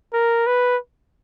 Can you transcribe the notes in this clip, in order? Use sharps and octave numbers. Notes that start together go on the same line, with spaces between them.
A#4
B4